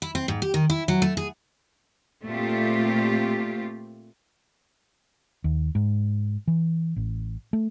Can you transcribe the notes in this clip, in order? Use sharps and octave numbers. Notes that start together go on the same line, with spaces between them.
E4
C4
G#2
G4
D#3
E4
F#3
A3
G#4
A#2 A3 C4 F4 G4
D#2
G#2
E3
A1
A3